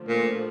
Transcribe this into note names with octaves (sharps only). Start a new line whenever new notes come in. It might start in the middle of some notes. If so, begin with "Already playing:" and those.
Already playing: D3 F3 A3
A#2